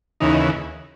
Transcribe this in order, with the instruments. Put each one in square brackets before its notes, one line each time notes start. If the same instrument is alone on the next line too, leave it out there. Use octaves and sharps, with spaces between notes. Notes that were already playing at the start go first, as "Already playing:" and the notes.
[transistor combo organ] D#2 C#3 E3 D#4